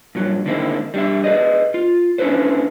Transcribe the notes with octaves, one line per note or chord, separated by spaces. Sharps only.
G2 A#2 F#3
D3 D#3 G#3 A#3 C4 E4
G3 D4 E5
G#4 B4 D5 D#5
F4
C#4 D4 E4 A4 B4 C5